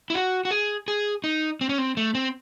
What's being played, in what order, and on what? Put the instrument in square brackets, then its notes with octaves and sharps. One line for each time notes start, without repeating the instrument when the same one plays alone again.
[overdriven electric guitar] E4
F#4
F#4
G#4
G#4
D#4
C4
C#4
C4
A3
C4